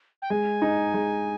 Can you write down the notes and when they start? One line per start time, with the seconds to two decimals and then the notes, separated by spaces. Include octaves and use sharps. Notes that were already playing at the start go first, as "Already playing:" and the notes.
0.22 G5
0.30 G#3 G#5
0.62 D#4
0.94 G#3